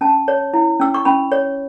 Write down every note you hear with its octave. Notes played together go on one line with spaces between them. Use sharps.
C#4 A5
C#5
E4
C#4 E6
C#6
C#4 B5
C#5